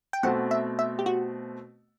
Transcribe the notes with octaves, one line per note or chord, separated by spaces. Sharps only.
G5
B2 A3 C4 F#5
E5
E5
G4
F#4